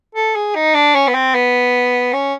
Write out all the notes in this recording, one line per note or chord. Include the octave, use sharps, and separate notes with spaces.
A4
G#4
D#4
D4
C#4
B3
C4
B3
C#4